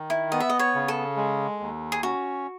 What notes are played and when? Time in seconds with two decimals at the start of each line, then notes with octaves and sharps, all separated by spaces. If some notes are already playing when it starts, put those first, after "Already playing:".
Already playing: D#3
0.10 E4
0.32 B3 D#5
0.40 E5
0.50 D#5
0.59 C#5
0.75 C#3
0.88 A4
1.17 G#3
1.60 D#2
1.92 G#4
2.03 C#4 F#4